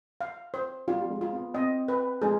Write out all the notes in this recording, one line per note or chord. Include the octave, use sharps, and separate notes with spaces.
F5
C5
G3 F4
G3
G#3
F4
B3
C4 D#5
B4
G#3 G#4